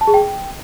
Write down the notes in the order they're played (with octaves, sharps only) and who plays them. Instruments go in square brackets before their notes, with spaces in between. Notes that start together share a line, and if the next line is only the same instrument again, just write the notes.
[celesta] A5
G#4
G5